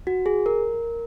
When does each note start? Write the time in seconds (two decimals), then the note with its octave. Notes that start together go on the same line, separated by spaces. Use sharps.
0.07 F#4
0.26 G#4
0.46 A#4